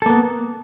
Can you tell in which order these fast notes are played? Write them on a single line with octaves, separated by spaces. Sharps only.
A4 A#3 B3